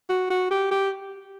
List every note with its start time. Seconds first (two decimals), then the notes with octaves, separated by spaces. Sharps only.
0.09 F#4
0.30 F#4
0.51 G4
0.71 G4